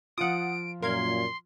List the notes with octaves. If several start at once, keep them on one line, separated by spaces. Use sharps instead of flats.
F3 F4 F#5 D#6 D7
F#2 A#2 A#4 F5 C6 G#6